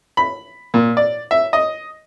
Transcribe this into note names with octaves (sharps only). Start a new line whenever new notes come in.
B5
A#2
D5
E5
D#5